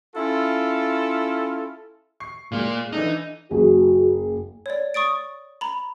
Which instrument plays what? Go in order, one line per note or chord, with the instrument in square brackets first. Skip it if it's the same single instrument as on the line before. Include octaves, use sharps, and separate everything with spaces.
[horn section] C#4 E4 F4 A4
[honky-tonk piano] C#6 C7
[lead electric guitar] A#2 A#3 [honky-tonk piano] G#3 F5
[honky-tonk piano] E3 D4 A4 [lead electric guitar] D#4
[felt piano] F#1 G#4 [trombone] F#4
[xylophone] C#5 D5
C#6 D#6 A6 D7
A#5 B5